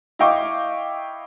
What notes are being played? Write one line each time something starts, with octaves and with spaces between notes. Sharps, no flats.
E4 D#5 F5 G5 C#6 D6